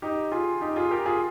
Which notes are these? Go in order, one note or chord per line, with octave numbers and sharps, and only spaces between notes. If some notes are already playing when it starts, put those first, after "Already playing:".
D#4 G4
F4 G#4
D#4 G4
F4 G#4
G4 A#4
F4 G#4